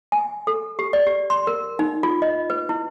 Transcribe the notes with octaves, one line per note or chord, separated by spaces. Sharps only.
G#5
A4
G4
D5
G4
C6
A#4
D#4
F4
D#5
B4
E4